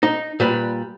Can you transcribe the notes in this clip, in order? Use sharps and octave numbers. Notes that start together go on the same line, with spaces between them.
D#4
A#2 G3 B4